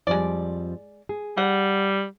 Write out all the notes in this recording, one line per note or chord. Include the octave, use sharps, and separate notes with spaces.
F2 F3 G3 G#3 D5
G#4
G3 F#5